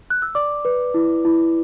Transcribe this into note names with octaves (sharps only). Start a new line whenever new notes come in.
F#6
E6
D5 D6
B4
E4
E4